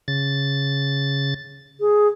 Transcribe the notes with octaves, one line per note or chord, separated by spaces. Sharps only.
C#3 A6
G#4